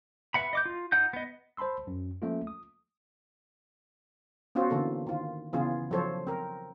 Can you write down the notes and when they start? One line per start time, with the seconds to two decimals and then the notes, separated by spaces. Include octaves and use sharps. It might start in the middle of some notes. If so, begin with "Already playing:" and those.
0.34 B4 E5 F#5 B5
0.53 D#5 D6 G6
0.66 F4
0.92 D#4 F#5 G6
1.13 B3 D#5
1.57 C5 A5 B5 C6 E6
1.87 F#2
2.22 F3 A3 A#3 C#4 F4
2.47 D#6
4.55 B3 C#4 F4 F#4 C5
4.70 D3 E3 A#3 A4
5.07 D#3 F4
5.53 C#3 E3 B3 C#4 F4 G#4
5.91 F3 F#3 A4 C5 C#5
6.27 C4 A#4